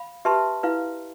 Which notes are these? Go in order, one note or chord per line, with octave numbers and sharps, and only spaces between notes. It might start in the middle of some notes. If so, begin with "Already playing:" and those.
Already playing: F5 B5
G4 B4 E5 A5 C6
E4 B4 F5